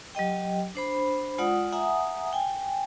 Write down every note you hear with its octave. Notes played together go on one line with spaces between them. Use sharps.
F#3 G4 D#5 G5
D4 C5 B5
G#3 F4 D5 F#5 D#6
E5 F#5 G#5 A#5 D#6
G5 G#5